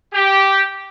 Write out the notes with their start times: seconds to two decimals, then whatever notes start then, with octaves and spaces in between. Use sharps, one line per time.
0.13 G4